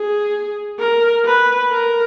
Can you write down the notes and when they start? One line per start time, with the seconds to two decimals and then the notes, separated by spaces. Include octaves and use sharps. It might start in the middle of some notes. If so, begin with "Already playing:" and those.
Already playing: G#4
0.80 A#4
1.26 B4
1.72 A#4